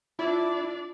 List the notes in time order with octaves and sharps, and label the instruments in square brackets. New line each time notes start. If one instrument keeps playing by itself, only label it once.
[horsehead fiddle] D4 D5 [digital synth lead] E4 [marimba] F4